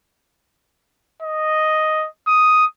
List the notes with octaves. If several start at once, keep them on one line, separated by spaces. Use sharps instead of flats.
D#5
D#6